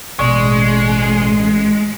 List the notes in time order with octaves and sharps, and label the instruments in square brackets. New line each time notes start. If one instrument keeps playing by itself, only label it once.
[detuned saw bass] A1 [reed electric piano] B2 D5 C#6 [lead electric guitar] G#3